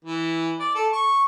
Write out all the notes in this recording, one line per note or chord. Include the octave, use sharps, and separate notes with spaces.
E3
D5
A4
C#6